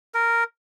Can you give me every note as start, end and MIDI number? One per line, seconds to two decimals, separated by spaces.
0.14 0.44 70